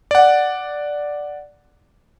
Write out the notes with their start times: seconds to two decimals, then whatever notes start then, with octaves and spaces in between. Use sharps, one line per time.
0.11 D5 F#5